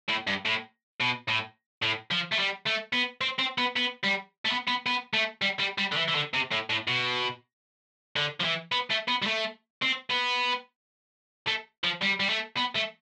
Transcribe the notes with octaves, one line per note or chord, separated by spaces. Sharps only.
A2
G2
A2
B2
A2
A2
F3
A3
G3
A3
B3
C4
C4
B3
B3
G3
A3
B3
B3
B3
A3
G3
G3
G3
D3
E3
E3
D3
C3
A2
A2
B2
D3
F3
E3
B3
A3
B3
G3
A3
C4
B3
A3
F3
G3
G3
A3
B3
A3